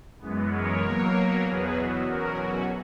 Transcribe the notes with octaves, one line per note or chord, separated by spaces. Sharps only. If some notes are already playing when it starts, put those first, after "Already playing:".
F#2 E3 G#3 B3
A#4 C#5
B2 F#3 A#3
E2 B2 F#3 B3 G#4 B4
F#4
E2 B2 F#3 C#4 F#4 A#4
F#4